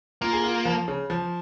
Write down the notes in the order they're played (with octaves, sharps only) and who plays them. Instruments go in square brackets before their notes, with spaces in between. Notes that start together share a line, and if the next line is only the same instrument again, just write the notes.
[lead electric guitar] A#3 [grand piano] F4
[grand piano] G#4
F4
F3
C#3
F3